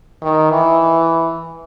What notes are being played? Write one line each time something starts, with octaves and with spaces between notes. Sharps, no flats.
D#3
E3